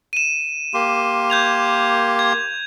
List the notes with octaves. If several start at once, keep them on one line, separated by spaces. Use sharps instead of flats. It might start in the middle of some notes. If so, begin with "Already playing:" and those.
D#7 E7
A#3 G4 C6
G6 G#6 F7
G#6